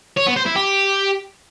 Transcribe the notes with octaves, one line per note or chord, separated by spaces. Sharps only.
C#5
B3
C5
E4
G4